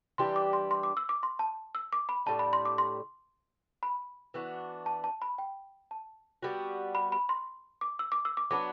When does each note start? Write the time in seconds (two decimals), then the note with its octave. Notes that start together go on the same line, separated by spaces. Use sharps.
0.18 E3 G3 D4 G4 C6
0.36 D6
0.53 C6
0.71 C6
0.83 D6
0.97 E6
1.09 D6
1.23 C6
1.39 A5
1.75 E6
1.93 D6
2.09 B5
2.26 A2 G3 D4 A5
2.39 B5
2.53 C6
2.65 D6
2.78 C6
3.83 B5
4.34 E3 B3 D4 F#4
4.86 A5
5.04 A5
5.22 B5
5.38 G5
5.91 A5
6.43 G3 B3 F#4
6.95 B5
7.12 B5
7.29 C6
7.81 D6
7.99 E6
8.12 D6
8.25 E6
8.37 D6
8.51 F#3 B3 D4 D6